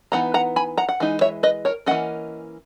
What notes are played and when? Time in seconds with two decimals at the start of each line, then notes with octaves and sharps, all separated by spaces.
0.12 E3 B3 D#4 F#5 A#5
0.34 F#5 A#5
0.56 G#5 B5
0.78 F#5 A#5
0.89 F#5
1.00 E3 G#3 D#4
1.21 C#5 E5
1.43 B4 D#5
1.65 A#4 C#5
1.86 E3 A#3 C#4 D#5 F#5